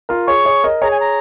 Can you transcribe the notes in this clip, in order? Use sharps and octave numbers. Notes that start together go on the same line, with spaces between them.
F4 A#4
G#4 C#5 C#6
G#4 C#5
A#4 D#5
G#4 C#5 A#5
G#5
A#5